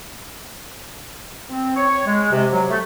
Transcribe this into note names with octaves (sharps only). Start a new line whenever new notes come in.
C4
C#5
G#3
C3
F#3
A3